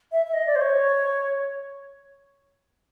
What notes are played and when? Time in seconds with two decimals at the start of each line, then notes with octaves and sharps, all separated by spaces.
0.12 E5
0.27 E5
0.33 D#5
0.47 D5
0.56 C5
0.61 C#5